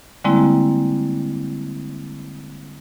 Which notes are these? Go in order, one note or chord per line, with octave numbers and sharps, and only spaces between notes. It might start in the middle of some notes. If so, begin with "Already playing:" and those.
D3 G3 G#3 A#3 C4 E4